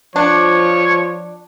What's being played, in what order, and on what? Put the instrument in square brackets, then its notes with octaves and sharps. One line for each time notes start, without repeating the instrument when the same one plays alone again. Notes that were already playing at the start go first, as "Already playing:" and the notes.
[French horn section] F3 [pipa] D4 [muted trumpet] C#5